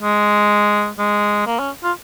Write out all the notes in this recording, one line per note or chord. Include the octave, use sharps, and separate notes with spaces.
G#3
G#3
A#3
C#4
F4